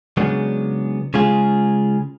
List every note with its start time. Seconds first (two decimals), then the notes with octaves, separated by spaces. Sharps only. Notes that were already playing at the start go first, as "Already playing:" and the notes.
0.17 C#3 F#3 G#3 B3 D4
1.14 C#3 G#3 F4 G#4